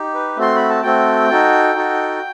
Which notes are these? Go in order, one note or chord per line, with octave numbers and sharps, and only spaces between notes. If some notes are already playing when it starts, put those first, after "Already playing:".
Already playing: D#4 G4
B4
A3 C4 F#4 A4 C6
B5
A5
A3 C4 F#4 A4 G5
D#4 F#4 A4
D#4 F#4 A4